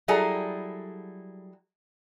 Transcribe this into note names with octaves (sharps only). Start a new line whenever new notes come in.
F#3 G3 E4 G#4 A4 A#5